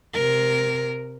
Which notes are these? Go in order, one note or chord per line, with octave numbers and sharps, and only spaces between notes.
C3 A#4